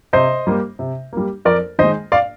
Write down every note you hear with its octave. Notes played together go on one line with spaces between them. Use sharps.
C3 C5 D#5
G3 A#3
C3
G3 A#3
F2 A#4 D5
D#3 G#3 C5 D#5
D5 F5